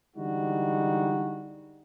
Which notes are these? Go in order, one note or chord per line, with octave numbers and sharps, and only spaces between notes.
D3 E3 G3 G#3 D#4 F#4